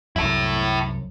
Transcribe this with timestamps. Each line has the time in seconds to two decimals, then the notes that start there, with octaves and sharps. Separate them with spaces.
0.16 C2 F#2 E4 A4